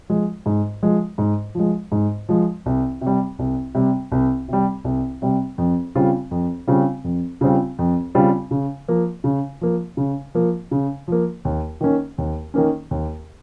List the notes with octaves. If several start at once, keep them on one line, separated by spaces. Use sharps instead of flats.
F3 G#3
G#2
F3 G#3
G#2
F3 G#3
G#2
F3 G#3
C2
C3
G3
C2
C3 G3
C2
C3 G3
C2
C3 G3
F2
C#3 G3 C4 F4
F2
C#3 G3 C4 F4
F2
C#3 G3 C4 F4
F2
C#3 G3 C4 F4
C#3
F3 A#3
C#3
F3 A#3
C#3
F3 A#3
C#3
F3 A#3
D#2
D#3 A#3 C#4
D#2
D#3 A#3 C#4
D#2